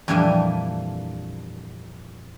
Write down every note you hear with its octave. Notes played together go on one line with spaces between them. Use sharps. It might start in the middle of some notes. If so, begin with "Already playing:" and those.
F2 A#2 E3 G3 D4 G#5